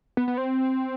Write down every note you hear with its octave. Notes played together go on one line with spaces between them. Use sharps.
B3
B3
C4